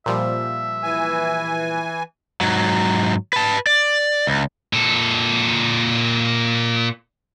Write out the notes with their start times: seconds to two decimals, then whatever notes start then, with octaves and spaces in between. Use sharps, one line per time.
0.06 A#2 F3 G3 E5
0.83 E3 G#5
2.41 G#2 F#3
3.33 B4 A5
3.67 D5
4.27 C#2
4.73 A#2 A4